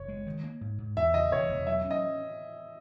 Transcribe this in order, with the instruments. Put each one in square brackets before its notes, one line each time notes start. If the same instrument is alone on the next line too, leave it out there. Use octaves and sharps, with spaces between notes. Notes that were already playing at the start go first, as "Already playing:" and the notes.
Already playing: [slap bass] F#1 [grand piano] C#5
[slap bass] G#3
D#3
A#3
G#2
G#2
[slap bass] E2 [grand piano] E5
[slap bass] C#3 [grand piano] D#5
[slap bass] E1 [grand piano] C#5
[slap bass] E1
[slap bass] F#3 [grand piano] E5
[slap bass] C#4
[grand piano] D#5